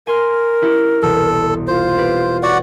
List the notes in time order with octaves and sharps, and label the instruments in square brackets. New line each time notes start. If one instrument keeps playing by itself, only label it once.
[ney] A#4 [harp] G#5 C6 F6
[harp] C#4 E4 G4
[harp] E1 C2 B2 [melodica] A4
[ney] F4 [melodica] C5
[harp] C4 G4 B4
[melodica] F#4 D5 F#5 [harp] C#5